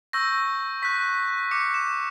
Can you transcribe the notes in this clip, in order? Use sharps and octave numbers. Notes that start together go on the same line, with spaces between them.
C#6 E6 G6 A#6
C#6 F#6 B6
D6 F#6 C#7
E7